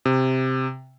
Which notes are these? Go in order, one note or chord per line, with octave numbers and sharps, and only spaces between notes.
C3